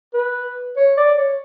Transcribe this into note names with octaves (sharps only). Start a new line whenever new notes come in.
B4
C#5
D5
C#5